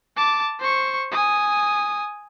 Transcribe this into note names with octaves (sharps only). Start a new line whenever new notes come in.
A5 D6
C5 C#6
G#5 D#6